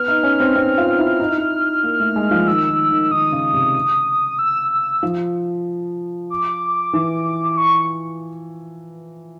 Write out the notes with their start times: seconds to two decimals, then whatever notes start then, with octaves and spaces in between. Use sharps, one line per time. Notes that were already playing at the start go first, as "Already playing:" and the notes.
Already playing: B3 F6
0.08 D#4
0.23 C#4
0.40 C4
0.56 C4
0.78 F4
0.99 E4
1.20 D#4
1.29 E4
1.38 D#4
1.84 A#3
2.00 A3
2.16 G#3
2.31 F3
2.47 D#3 E6
2.69 D#3
2.90 D#3
3.11 D#3 D#6
3.32 C#3
3.53 C3
4.39 E6
4.70 E6
5.03 F3
6.30 D6
6.93 E3
7.58 C#6